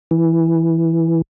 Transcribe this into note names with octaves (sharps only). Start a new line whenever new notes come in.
E3